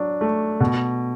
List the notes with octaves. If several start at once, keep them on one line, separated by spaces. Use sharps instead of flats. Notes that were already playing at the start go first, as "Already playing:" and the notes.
Already playing: F#3 D4
A3
B2